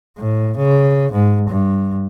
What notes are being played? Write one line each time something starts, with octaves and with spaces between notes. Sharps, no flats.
A2
C#3
G#2
G2